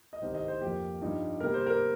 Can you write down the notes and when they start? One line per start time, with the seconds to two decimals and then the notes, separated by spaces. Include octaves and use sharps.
0.13 D#5
0.22 C2 C3 D#3 C4 C5
0.34 D#5
0.48 C5
0.61 F2 F3 A#3 G4
1.01 G2 F3 D#4
1.40 C3 G3 A#3 A#4
1.54 C5
1.67 A#4